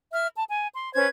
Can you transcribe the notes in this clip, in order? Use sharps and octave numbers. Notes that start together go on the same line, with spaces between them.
E5 F6
A5
G#5
C6
C#4 B4 C5 G#6